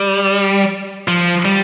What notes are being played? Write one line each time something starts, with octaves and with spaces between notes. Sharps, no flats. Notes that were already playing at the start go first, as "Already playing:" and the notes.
Already playing: G3
F3
G3